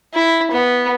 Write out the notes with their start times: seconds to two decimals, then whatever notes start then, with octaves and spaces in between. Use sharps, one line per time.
0.14 E4
0.51 B3